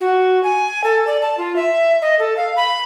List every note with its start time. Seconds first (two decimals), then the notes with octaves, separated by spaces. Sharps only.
0.01 F#4
0.44 G#5
0.84 A4
1.07 D5
1.22 A5
1.38 F4
1.56 E5
2.02 D#5
2.19 A4
2.37 F5
2.57 B5